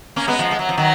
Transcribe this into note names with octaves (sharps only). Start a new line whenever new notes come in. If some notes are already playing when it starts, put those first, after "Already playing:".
A#3 C#4
G#3 B3
F3 G#3
G#3
F#3
F3
D#3 F#3